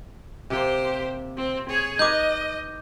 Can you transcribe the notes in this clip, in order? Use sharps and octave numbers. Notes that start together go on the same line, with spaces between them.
C3 A#3 G4 C5
C4
G#4 C#5
D#4 B4 D#5 D6 G6